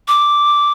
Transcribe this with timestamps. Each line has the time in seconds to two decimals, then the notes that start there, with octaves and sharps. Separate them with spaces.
0.08 D6